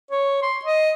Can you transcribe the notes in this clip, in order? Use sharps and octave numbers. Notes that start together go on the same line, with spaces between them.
C#5
C6
D#5